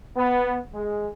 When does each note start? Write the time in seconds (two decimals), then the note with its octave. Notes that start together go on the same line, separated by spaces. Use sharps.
0.17 B3
0.73 G#3